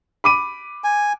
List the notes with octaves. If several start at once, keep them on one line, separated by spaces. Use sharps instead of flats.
B5 D6 D#7
G#5